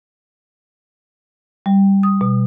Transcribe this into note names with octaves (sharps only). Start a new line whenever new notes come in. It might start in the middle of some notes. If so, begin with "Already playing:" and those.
G3
D#6
B2